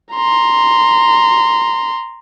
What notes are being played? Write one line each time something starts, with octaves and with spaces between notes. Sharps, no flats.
A#5 C6